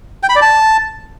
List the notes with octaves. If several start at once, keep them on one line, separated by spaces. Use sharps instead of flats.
G5
B5
D5
A5